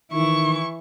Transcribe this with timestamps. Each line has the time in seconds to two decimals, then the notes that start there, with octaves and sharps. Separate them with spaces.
0.13 D#3 E3 E4 C#6